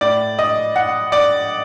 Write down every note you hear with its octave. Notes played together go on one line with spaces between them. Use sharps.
A2 D5
D#5
F#5
D5